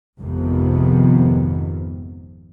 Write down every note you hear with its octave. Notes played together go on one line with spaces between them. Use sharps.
G#1 F2 G#2 C3 D#3 B3